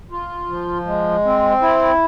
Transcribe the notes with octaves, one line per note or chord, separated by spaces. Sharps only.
F4
F3
G#3
C4
E4